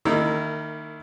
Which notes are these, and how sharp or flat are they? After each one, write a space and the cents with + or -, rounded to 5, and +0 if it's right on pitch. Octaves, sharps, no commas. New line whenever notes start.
D#3 -20 A#3 -35 E4 -5